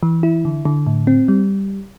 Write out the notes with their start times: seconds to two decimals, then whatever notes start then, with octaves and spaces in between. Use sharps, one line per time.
0.03 E3
0.23 E4
0.45 D3
0.65 D3
0.87 A2
1.07 C4
1.28 G3